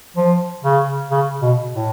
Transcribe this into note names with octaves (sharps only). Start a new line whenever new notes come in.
F3
C#3
C#3
B2
A2